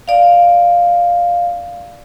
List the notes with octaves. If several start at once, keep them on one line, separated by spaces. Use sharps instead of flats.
D5 F5